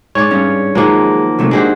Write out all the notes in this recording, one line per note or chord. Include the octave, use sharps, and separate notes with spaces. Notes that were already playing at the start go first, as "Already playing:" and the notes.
G#2 C#5 D5
G2 C#4
D#3 F3 F#3 G#3 A#3
C3 F#3 A3
G#3 D4 F#4 G4 C5